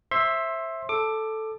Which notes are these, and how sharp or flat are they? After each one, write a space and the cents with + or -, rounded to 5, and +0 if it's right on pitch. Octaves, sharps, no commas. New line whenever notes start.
C5 +35 E5 +0 C6 +20
A4 +0 D6 +20